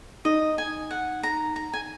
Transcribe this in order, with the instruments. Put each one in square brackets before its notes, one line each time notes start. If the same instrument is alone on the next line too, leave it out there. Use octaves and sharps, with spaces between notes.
[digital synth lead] D#4 [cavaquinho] D#5
[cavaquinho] G#5
F#5
A#5
A#5
G#5